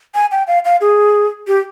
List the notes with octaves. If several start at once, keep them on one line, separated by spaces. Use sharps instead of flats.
G#5
G5
F5
F5
G#4
G4